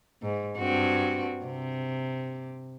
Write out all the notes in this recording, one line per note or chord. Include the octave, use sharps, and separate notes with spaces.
G#2
G2 C4 F#4
C3